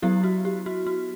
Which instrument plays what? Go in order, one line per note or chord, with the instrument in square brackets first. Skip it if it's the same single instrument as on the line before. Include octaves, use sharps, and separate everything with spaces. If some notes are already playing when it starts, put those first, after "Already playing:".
[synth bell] F#3 B3 E4 G4
F#4
G4
F#4
F#4